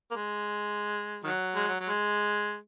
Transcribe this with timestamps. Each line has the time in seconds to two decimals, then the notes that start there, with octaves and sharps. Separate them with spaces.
0.11 A#3
0.16 G#3
1.24 D#3 F#3
1.56 G#3
1.68 F#3
1.80 F#3
1.89 G#3